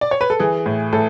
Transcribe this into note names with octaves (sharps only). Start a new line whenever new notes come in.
D5
C#5
B4
A4
E3 G#4
A2
A2 A4